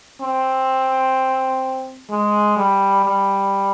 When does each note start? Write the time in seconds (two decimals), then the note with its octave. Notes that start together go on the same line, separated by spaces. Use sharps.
0.21 C4
2.10 G#3
2.57 G3
3.05 G3